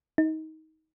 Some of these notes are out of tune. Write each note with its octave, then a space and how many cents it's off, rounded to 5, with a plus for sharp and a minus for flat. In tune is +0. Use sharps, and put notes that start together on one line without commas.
D#4 +25